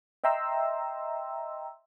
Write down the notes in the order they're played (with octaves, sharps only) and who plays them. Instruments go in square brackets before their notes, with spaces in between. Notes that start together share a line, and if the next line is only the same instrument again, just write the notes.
[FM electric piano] D#5 E5 G5 A#5 C6 E6